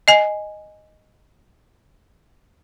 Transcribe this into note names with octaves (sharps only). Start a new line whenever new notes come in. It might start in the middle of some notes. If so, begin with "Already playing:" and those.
D#5 G#5